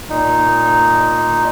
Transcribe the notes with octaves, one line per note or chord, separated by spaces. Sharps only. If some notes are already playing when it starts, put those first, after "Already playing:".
A#2 D#4